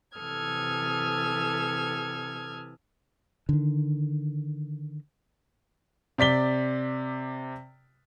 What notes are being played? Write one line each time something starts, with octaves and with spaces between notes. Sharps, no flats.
C3 E3 A4 D#6 F6 G#6
D3 D#3
C3 D5 B6 G7